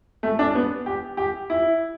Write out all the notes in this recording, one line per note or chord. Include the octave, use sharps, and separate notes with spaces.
A3
D4
B3
G4
G4
E4